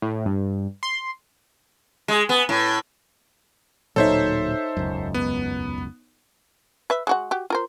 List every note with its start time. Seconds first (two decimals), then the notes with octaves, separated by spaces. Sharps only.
0.02 A2
0.25 G2
0.83 C6
2.08 G#3
2.29 B3
2.49 A2
3.96 D1 A#2 F#3 D#4 A4 C5 C#5 E5
4.77 E1 C#2 F#2
5.14 B3
6.90 B4 E5
7.07 G#3 F#4 F#5
7.31 F#4 G4
7.50 F4 A#4 C5